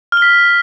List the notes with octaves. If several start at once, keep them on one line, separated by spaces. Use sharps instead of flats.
F6 B6 G7